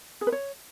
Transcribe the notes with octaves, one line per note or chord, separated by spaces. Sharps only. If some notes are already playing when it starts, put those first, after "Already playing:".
G#4
B4
C#5